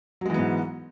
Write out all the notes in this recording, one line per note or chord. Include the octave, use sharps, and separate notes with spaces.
G#2 E3 F#3 G#3 B3